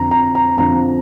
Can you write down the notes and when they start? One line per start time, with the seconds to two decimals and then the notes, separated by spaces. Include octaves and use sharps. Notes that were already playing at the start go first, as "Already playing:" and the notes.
Already playing: F2 D3 F3 A#5
0.11 A#5
0.35 A#5
0.57 F2 D3 F3 A#5